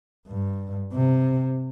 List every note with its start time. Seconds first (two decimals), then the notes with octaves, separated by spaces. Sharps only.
0.27 G2
0.93 C3